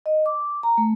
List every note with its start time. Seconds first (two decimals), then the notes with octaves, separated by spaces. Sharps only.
0.06 D#5
0.26 D6
0.63 A#5
0.78 A3